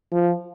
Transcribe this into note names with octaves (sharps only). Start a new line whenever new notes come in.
F3